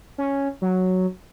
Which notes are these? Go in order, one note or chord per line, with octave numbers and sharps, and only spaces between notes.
C#4
F#3